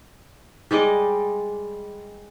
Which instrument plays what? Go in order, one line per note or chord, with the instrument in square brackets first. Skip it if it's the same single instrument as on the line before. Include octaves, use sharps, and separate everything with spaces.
[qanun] G3 G#3 D5 D#5